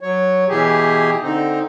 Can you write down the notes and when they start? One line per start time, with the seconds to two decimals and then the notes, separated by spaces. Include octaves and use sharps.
0.01 F#3 C#5
0.49 B2 E3 G4 G#4
1.23 D3 C4 D#4